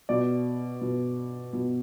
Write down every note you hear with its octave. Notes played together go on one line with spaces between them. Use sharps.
B2 D5
B2
B2